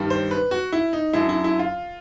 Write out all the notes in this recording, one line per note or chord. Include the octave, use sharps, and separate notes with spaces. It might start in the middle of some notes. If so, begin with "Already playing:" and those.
Already playing: G2 D#3 G3
C5
B4
F#4
E4
D#4
F#2 D3 F#3 E4
E4
E4
F4